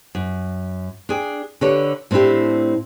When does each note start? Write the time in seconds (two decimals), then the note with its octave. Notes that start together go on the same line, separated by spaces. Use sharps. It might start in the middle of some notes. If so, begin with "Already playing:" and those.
0.15 F#2
1.09 D4 G#4 G5
1.61 D3 G4 A4 B4 C#5
2.11 A2 C4 D4 E4 G4